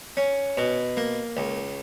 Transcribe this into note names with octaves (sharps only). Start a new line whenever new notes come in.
C#4
B2
A#3
C#2